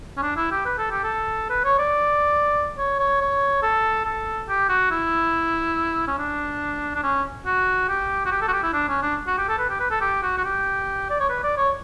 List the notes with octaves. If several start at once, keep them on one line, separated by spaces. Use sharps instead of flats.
C#4
D4
E4
G4
B4
A4
G4
A4
B4
C#5
D5
C#5
C#5
C#5
A4
A4
G4
F#4
E4
C#4
D4
D4
C#4
F#4
G4
F#4
G4
A4
F#4
G4
E4
D4
C#4
D4
F#4
G4
A4
B4
G4
B4
A4
G4
F#4
F#4
G4
D5
C#5
B4
D5
C#5